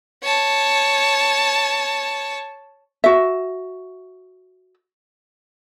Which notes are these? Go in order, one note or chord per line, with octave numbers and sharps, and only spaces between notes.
C#5 A5
F#4 E5